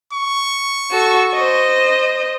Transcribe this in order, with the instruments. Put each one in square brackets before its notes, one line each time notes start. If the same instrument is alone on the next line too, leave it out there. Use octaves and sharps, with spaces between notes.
[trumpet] C#6
[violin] F#4 A4
C5 D#5